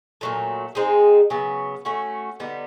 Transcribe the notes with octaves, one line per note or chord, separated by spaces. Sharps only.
A#2 F#3 A3
G#3 C4 D#4 G#4
C#3 F#3 B3
A3 C#4 F#4
D3 G3 B3 D#4